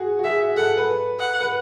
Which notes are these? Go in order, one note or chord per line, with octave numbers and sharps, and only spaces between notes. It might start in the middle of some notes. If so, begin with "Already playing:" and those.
Already playing: F#4 G#4
F#4
G#4 E5
F#4
A4 F#5
A4
B4
F#5
B4